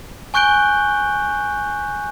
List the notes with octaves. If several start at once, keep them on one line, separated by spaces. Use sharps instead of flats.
G#5 C#6 F#6 G6 D7 G7